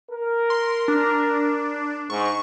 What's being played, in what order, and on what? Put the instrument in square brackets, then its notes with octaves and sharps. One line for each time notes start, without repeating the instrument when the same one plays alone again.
[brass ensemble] A#4
[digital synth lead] C6
D4
[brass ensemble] G#2 [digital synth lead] C#6